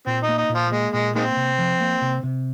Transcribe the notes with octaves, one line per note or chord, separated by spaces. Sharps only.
A#2 C4
D#4
A#3
D#4
A#2
F3
G#3 A#3
A#2 G#3
D#3 G#3 A#3 C4
C3
F3
A#3
C3
C3